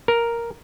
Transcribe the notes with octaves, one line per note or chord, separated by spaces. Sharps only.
A#4